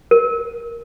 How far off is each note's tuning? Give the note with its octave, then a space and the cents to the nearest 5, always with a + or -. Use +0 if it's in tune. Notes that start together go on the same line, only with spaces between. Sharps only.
A#4 +0